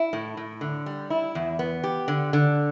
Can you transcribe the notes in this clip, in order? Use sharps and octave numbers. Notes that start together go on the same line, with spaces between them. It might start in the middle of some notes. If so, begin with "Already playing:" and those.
Already playing: E4
A2
A2
D3
G3
E4
E2
B3
G4
D3
D3